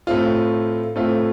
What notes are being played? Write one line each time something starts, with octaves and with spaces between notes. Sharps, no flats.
A2 A3 C4 F4
A2 A3 C4 F4